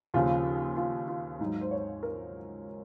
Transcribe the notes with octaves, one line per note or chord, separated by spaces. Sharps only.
D#2 C#3 F3 F4
F4
F4
G#2 F#3 D#4
C5
C#5
A#4